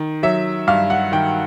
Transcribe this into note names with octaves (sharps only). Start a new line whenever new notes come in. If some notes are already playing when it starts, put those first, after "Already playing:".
Already playing: D#3
F#3 E5
G2 F5
F#5
D#3 G5